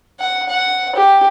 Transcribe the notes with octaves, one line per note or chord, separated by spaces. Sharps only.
F#5
F#5
G4